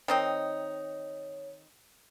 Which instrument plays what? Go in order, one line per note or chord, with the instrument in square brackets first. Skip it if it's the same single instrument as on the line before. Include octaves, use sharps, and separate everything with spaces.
[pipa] D#3 C4 D#4 [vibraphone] C#5